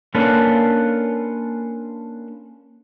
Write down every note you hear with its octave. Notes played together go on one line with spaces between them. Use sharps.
A#3 C#4 D4 F4 A4 B4